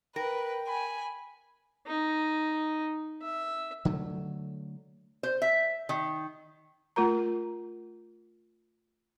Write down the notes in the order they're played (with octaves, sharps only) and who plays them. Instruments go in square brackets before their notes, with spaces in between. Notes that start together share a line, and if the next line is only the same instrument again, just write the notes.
[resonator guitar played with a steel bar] A#4 [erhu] B4 [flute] G5
[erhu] G#5 [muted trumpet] B5
[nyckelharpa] D#4
E5
[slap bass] D3 F#3 A3
[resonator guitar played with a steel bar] C5
E5
D#3
[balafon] A3 F4 A#4 A#5